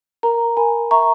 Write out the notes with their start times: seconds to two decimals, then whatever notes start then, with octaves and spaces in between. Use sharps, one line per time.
0.23 A#4 A#5
0.57 A#4 G#5 B5
0.91 E5 A#5 C#6